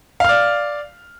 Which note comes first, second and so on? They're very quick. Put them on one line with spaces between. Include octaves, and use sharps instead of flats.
F5 F6 D5